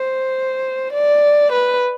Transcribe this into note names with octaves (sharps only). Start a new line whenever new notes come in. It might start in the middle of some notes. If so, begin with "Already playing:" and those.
Already playing: C5
D5
B4